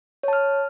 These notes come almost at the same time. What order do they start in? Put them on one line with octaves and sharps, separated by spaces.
C#5 A5 F6